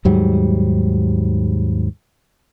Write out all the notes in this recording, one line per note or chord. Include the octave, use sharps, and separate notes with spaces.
D#2 G#2 F#3 G3